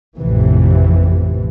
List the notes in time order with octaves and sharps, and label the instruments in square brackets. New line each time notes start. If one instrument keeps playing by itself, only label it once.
[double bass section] A1 F2 C3 E3